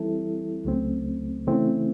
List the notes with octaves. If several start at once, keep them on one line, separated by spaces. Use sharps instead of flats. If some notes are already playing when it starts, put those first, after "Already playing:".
Already playing: E3 G3 C4 E4 A4
C#2 C#3 F#3 A3 C4
C#3 E3 A3 C4 E4